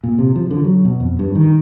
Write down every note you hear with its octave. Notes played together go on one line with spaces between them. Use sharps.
A#2
C3
F3
D3
F#3
B2
F2
G2
D#3